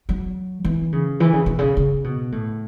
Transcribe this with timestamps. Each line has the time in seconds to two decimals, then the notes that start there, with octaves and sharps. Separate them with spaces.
0.09 F#3
0.64 E3
0.92 C#3
1.20 E3
1.33 C#3
1.46 B2
1.59 C#3
1.77 C#3
2.04 B2
2.32 A2